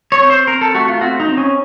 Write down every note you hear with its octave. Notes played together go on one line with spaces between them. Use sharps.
C#5
C4
C5
C4 A#4
A4
A3 F#4
F4
C4 F#4
D#4
C4
C#4